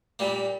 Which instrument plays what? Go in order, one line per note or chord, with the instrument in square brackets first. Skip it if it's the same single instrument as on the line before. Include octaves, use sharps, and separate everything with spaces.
[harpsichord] A#2 G3 A#3